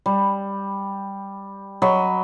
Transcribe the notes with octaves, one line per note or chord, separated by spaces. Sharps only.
G3
F#3 D#5 B5 C#6